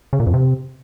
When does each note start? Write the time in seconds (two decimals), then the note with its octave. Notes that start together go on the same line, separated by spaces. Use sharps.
0.13 C#3
0.20 A#2
0.27 F2
0.34 C3